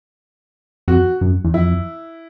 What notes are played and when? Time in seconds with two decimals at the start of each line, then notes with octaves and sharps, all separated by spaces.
0.88 F2 F#4
1.21 F#2
1.44 E2
1.54 F2 E4